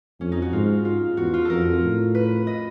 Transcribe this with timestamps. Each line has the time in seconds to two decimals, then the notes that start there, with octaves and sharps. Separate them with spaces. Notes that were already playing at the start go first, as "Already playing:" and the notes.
0.20 F2 C#4
0.32 D#4
0.42 F#4
0.53 G#2 F4
0.85 F4
1.17 E2 F#4
1.34 F4
1.45 F2 A4 A#4
1.82 A2
2.15 B4
2.47 D#5